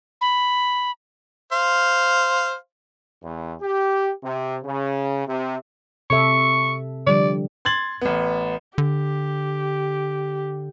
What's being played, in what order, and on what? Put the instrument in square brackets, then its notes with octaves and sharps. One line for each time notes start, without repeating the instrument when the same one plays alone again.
[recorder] B5
[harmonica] C5 F5
[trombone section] E2
G4
C3
C#3
C3
[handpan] C3 A4 E5 [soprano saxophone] C#6
[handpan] D3 F3 G3 [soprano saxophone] D5
[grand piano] C6 G#6 A6 F#7
A1 B3
[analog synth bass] D3 [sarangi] G4